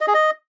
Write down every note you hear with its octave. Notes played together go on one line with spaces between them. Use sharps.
D#5
G#4
D#5